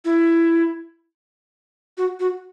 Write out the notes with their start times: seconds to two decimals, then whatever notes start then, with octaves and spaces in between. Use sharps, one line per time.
0.05 E4
1.98 F#4
2.20 F#4